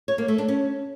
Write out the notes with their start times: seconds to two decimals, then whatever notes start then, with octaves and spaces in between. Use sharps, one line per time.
0.08 C#5
0.18 A#3
0.28 A3
0.38 D4
0.48 C#4